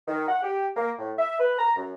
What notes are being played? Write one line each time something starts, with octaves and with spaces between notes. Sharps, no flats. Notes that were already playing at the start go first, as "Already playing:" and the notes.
D#3
F#5
G4
A#3
A2
E5
B4
A#5
F#2